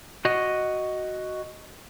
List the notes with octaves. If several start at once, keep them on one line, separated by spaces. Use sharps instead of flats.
F#4 D#5